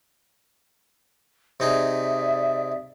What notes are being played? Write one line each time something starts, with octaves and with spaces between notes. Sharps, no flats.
C3 D#4 G#4 D5 E5